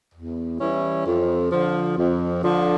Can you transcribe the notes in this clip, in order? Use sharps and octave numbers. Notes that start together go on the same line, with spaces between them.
E2
E3 G3 C#4 E4
F2
D3 F3
F2
D3 F3